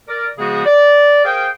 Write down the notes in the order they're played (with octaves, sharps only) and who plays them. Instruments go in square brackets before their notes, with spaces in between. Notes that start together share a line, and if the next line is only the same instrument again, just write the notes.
[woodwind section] A#4 D5
C#3 F3 G#3 B3 F#4 G#4
D5
G#4 A#4 C5 F5 G5